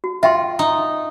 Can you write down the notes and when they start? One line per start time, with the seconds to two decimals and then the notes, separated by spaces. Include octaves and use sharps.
0.04 F#4
0.23 F4 E5 G5 C6
0.59 D#4